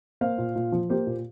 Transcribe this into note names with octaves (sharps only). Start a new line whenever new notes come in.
A#3 C5 F5
A#2
A#2
F3
A#3 G4 C5
A#2